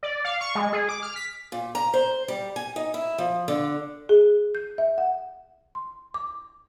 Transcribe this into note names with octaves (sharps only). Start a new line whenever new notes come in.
D5
F5
C#6
G#3
G#4
D6
F6
B6
A#2
A#5
C5
G3
G#5
D#4
E4
F3
D3
G#4
G6
E5
F#5
C6
D6